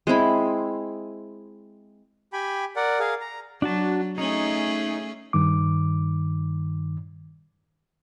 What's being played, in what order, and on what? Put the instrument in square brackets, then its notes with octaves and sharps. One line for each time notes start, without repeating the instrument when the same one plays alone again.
[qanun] G#3 C4 E4 B5
[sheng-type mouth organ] G4 G5 G#5 B5
A#4 D5 F#5
G#4 A#4 F5
A#5
[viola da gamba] F#3 [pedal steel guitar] D4 F#4 A5
[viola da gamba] A3 C#4 G#4 [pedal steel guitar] D#4
[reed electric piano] G2 D#3 D6